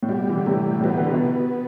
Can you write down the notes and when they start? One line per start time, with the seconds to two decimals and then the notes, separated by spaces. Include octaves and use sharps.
0.03 A2
0.09 B2 G3
0.29 E3
0.37 D3
0.46 A2 C3 E3
0.80 A2
0.84 B2 B3
0.98 D3
1.06 C3
1.14 B2